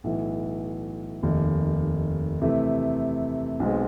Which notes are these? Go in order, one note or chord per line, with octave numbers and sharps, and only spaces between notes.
B1 A2 E3
F1 D#2 D#3
C3 E3 A3
B1 B2 G#3 C4